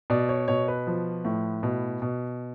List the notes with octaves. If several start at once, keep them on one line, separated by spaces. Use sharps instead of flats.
B2 D5
C#5
B2 C#5
B4
F3
A2
B2
B2